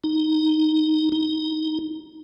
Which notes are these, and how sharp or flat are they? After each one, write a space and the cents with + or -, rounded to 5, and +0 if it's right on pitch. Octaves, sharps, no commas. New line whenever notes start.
D#4 +0
D#4 +10